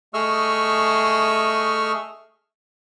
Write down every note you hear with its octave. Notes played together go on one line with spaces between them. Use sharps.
A3 G#4 D#5 C#6 E6 F6